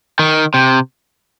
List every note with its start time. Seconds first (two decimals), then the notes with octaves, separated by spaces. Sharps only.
0.19 D#3
0.54 C3